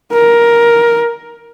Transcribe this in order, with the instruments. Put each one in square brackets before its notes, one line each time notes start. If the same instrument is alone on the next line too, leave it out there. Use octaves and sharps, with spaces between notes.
[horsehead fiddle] A#4